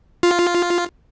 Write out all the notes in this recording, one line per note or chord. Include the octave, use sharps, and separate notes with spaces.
F4